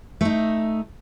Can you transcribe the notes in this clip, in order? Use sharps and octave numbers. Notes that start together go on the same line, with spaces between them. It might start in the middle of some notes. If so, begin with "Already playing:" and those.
A3 D#4